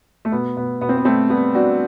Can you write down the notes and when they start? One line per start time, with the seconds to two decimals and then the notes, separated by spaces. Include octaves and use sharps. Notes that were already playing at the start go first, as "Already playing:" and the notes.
0.25 A3
0.32 B2 B3
0.57 B2 B3
0.81 B2 B3
0.89 C4
0.97 B3
1.05 G3 A3 C4
1.30 G3 B3
1.54 G3 D4 F#4